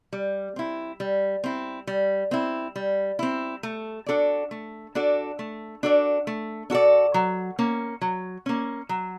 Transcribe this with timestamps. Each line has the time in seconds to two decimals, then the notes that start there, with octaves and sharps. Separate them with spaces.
0.13 G3
0.56 C4 E4
1.00 G3
1.44 C4 E4
1.87 G3
2.31 C4 E4
2.76 G3
3.19 C4 E4
3.63 A3
4.06 D4 F#4 A4 D5
4.51 A3
4.95 D4 F#4 A4 D5
5.39 A3
5.83 D4 F#4 A4 D5
6.27 A3
6.70 D4 F#4 A4 D5
7.14 F#3
7.59 A#3 C#4
8.01 F#3
8.46 A#3 C#4
8.89 F#3